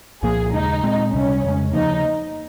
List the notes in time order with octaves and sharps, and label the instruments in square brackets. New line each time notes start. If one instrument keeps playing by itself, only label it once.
[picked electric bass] C2 A#2 F3 A#3 [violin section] G#4
[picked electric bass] D#2 C#3 G#3 [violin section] D#4
[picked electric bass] A#2 G#3 C4
[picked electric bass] C#2 C3 G3 [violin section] C#4
[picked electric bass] F2 C#3 G#3
[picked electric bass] D#2 C#3 F3 A#3 [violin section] D#4